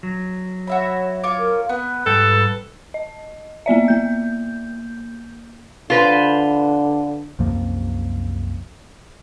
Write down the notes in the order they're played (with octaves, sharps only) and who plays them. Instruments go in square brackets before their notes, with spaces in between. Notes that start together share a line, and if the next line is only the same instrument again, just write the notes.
[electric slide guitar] F#3
[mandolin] F#4 E5 B5 [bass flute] C#5
[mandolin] F4 C#5 D6
[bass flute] A#4
[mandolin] B3 [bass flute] B4
[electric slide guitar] G#2 G3 [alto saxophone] A4 [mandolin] G5
[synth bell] D#5
A#3 B3 D5 E5
A#3 G6
[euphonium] D3 [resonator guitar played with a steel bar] F4 B4 C5
[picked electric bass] C2 F#2 F3 A#3